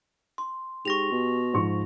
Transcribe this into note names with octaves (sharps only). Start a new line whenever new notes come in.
C6
G#2 G4 C#6 A#6 F7
B2
G#2 F3 C#6